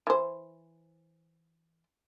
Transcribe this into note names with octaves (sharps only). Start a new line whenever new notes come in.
E3 C5